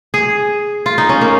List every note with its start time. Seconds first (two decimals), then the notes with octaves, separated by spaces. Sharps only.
0.14 G#4
0.86 F4
0.98 D#4
1.09 C#4
1.21 A#3